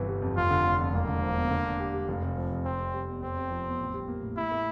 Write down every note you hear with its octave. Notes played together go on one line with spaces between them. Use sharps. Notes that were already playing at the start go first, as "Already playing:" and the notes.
Already playing: G1 C3 E3
G3
F2
F1 F4
D3
F1
F2
E1 A#3
D3
F3
E2
D3
D4
G4
G3
F1
C3
F3
F2
F1 C4
C3
G3
E2
F1 C4
C3
F3
E2
A1
G3
A#3
A2
A2 E4
A3